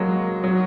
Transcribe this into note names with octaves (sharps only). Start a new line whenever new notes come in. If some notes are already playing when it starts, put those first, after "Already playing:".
Already playing: F#3 G#3 A#3
F#3